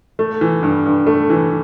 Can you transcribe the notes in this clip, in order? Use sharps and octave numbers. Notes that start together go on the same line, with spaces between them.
A3
E3
G2
G2
A3
E3